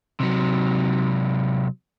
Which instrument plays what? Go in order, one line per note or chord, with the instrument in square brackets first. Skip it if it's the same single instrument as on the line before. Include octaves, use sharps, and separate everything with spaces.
[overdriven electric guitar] C3 F#3